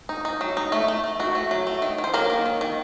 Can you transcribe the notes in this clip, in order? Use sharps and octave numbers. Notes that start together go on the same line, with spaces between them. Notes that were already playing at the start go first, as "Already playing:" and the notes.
D#4
D#4
F#3
D#4
A3 D#4
A3
A3
D#3 F#4
A3
F#3
A3
D#3
D#3
C5
F#3 A#3 A#4
D#3
D#3
D#3